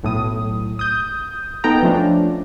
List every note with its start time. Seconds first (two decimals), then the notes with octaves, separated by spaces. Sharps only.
0.03 B1 A2 D#6
0.79 D#6 G6
1.64 B3 D#4 A4 G5 A#5
1.83 F3 A3 C#4 D4